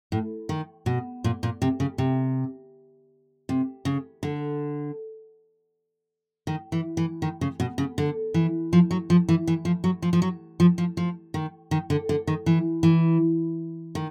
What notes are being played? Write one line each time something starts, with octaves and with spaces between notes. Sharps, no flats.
A2
D#3
B2
A#2
A#2
C3
C#3
C3
C3
C#3
D3
D#3
E3
E3
D#3
C#3
B2
C#3
D3
E3
F3
F#3
F3
E3
E3
F3
F#3
F3
F3
F#3
F3
F3
F3
D#3
D#3
D3
D3
D#3
E3
E3
D#3